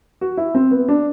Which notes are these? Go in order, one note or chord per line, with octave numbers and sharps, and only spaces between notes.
F#4
E4
C4
B3
D4